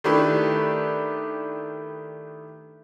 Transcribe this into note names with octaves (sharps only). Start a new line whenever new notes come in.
D#3 A3 D4 E4 G4 B4